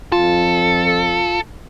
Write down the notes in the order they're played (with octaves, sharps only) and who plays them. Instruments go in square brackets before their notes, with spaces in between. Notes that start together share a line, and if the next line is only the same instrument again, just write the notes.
[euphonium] F2 [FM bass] F4 [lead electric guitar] A4